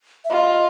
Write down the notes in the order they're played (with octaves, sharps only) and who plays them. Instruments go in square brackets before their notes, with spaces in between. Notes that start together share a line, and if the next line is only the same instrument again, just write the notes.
[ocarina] E5
[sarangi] F4 [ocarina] D#5